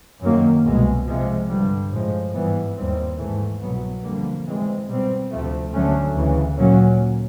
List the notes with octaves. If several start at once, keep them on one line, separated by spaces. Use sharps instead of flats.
F#2 D#3 F#3 A#3
C2 B2 G#3
C3 F3 G#3
G2 D3 G3
A2 F3 G#3
G#2 E3 G3 B3
D#2 D#3 G3 C4
G#2 E3 A3
C2 B2 F#3 B3
F2 D3 G3 A#3
A2 E3 G#3 C4
B2 G3 C4
D2 C3 F3 A3
D2 D3 F#3 A3 C#4
D2 C#3 E3
A#2 F#3 A#3 C#4